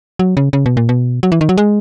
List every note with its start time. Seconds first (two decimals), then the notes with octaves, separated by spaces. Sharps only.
0.19 F#3
0.37 C#3
0.53 C#3
0.66 B2
0.77 A#2
0.89 B2
1.23 F#3
1.32 E3
1.41 D#3
1.49 F#3
1.58 G#3